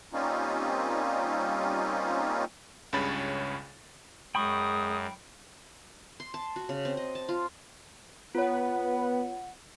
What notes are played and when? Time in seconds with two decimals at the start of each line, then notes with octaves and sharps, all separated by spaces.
0.13 G3 A#3 C4 C#4 D#4 F4
2.93 C#2 G2 C#3 C#5 B5 A6
4.35 F#2 G#3 G5 B5 C#6 D#6
6.20 C6
6.34 A5
6.56 F#4
6.69 C#3
6.85 C4
6.97 D#5
7.15 A5
7.29 F4
8.35 B3 F4 B4 C#5 F#5